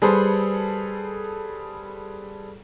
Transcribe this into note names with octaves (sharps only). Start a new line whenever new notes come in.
G3 G#4 A4 B4 C5